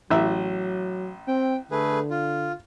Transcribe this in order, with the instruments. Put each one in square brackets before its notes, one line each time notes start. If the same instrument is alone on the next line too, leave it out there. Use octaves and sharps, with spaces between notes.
[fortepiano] A1 E5 [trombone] F#3
[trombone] C4 [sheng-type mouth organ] G5
[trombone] D3 [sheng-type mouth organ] A3 G#4 B4
[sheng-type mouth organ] F4